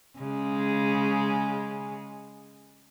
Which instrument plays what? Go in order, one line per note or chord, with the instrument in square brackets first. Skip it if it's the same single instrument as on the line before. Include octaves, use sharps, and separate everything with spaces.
[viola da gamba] C#3 G#3